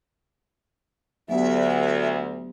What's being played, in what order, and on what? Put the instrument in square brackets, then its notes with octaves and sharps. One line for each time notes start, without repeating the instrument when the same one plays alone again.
[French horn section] D2 [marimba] F#3 B3 G4 [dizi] E5